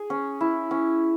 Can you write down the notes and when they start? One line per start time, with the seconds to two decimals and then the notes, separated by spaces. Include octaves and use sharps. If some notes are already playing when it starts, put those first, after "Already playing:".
Already playing: G#4
0.10 C#4
0.41 E4
0.71 C#4